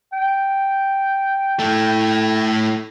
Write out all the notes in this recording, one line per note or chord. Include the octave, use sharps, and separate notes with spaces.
G5
A3 E4